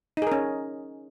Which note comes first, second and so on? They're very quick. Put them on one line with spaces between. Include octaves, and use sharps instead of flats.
D#4 G#4 A#4 C#4